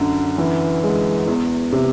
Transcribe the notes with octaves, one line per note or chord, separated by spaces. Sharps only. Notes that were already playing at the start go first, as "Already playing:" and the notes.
Already playing: F#2 D3
E3
G#3
E2
C3